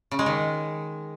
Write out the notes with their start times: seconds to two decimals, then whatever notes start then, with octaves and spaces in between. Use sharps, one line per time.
0.11 C#3
0.19 G#3
0.26 D#3